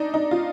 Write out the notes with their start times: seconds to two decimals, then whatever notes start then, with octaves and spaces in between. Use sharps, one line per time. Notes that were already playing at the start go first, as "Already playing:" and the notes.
Already playing: D4 D#4
0.14 D#4
0.31 F4